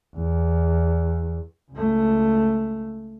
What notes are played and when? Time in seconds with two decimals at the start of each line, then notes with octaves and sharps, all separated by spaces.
0.16 E2
1.71 C#2 A3